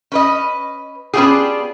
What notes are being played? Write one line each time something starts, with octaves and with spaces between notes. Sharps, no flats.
C#4 B4 D#5
B3 C#4 D4 F4 G4 G#4